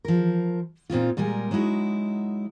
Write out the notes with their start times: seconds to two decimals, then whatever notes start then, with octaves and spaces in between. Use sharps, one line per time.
0.05 F3 A#4
0.90 A#2 C4 D#4 F4
1.17 A#2 G3 G#3 A#4 G#5
1.51 F#3 G#3 D#4 E4 F#4